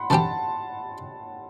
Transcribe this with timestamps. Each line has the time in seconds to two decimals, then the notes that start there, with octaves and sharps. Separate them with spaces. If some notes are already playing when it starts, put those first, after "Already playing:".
Already playing: F#5 B5 C6
0.10 F#2 D3 G3 C4 G4 A5